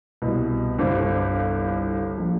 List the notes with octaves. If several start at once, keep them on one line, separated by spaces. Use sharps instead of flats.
C2 B2
G1 C2 C5 D6
A#1